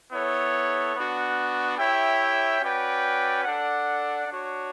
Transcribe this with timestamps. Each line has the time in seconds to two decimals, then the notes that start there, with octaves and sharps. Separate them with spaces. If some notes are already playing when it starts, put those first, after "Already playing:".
0.11 B3 E4 A4 C#5
0.95 B3 D4 F#4
1.78 E4 G4 C#5 E5 G5
2.61 C#4 F#4 B4 D5 G5
3.44 D4 A4 D5 F#5
4.28 D4 F#4 C#5